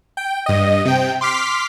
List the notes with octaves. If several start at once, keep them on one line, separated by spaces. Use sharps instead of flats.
G5
G2 D#5
C3 G5
C6 D6 F6 B6 C7